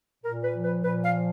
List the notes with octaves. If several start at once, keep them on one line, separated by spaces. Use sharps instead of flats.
A#2 A#4
B4
F3
B4
A#2 B4
F5
F3